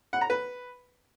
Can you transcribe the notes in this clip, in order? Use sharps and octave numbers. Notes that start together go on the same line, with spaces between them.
F#5
A#5
B4